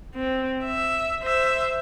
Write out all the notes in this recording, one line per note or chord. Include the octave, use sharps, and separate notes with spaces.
C4
E5
C5 E5